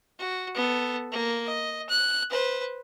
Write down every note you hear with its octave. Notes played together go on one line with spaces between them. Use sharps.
F#4
B3 A4
A#3
D#5
F#6
B4 C5